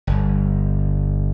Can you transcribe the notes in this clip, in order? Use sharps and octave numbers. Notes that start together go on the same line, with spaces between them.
G1